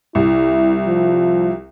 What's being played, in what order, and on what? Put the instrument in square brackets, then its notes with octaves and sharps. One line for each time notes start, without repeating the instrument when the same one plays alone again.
[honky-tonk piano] C2 [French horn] E4
[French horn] F3